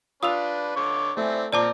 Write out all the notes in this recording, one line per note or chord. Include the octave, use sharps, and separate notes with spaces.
D4 F4 B4 D#6 E6 F7
D3 C#5 D6
A3 C4 E4 D5 G#5
A#2 F3 C4 A#4 D5 A5 D6